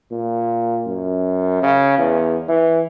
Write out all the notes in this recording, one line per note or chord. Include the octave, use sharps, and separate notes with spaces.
A#2
F#2
C#3
E2
E3